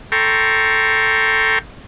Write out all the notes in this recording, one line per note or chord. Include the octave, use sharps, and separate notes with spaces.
A4 G5 A#5 C6 C#6